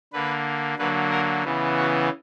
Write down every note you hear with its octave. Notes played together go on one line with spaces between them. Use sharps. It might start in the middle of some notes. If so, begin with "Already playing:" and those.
D3 A#3 B4
D3 F#3 A#3 B4
A#4
C#3 E3 B3
F#4